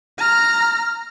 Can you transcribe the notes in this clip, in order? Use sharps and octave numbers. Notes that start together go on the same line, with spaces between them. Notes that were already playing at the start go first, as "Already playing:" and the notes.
A#5 F6